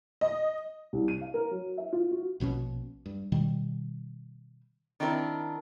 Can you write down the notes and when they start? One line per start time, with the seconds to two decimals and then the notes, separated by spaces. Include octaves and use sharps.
0.21 D#5
0.93 C2
1.08 D#7
1.21 F5
1.34 A#4
1.51 F#3
1.77 E5
1.93 F4
2.11 F#4
2.40 A#1 B2 C4 C#4
3.06 G2
3.32 B2 D#3 G3
5.00 D#3 C4 D4 E4 A4 A#4